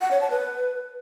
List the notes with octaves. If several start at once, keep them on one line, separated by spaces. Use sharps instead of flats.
F#5
C#5
A5
B4